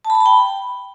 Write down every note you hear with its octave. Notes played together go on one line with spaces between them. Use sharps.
A5
B5
A5
B5
G5